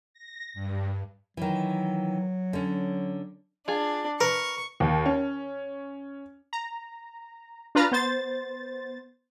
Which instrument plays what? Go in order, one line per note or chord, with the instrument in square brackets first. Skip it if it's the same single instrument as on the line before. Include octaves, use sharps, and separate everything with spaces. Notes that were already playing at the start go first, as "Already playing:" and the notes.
[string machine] A#6
G2
[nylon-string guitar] D#3 E3 [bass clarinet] F#3
[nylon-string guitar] D3 C#4
[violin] D4 [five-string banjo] F4 G#4
[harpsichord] A#4 [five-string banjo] B4 [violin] C#6
[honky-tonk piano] D#2
C#4
[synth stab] A#5
D4 F4 B4 A#5 F6 A6
B3 C5 A6